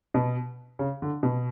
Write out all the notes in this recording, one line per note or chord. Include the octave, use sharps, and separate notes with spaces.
B2
C#3
D3
B2